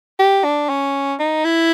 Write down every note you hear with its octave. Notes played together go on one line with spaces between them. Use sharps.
G4
D4
C#4
D#4
E4